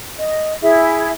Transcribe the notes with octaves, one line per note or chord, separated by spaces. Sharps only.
D#5
E4 G#4 E5